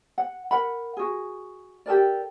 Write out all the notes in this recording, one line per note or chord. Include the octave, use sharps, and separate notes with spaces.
F#5
A#4 F#5 B5
F#4 G#4
G4 A4 A#4 D5